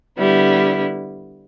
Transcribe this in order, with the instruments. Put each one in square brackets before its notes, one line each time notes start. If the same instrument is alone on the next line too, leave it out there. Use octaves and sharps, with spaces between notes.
[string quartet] D3 G3 B3 E4